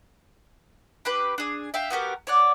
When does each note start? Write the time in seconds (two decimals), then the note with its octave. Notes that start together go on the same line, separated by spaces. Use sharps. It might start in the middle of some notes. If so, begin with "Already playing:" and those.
1.05 D4 G4 B4
1.38 D4 G#4
1.74 E5 F5 G5
1.90 B3 F#4 G4 A#4
2.27 C#5 D5 F#5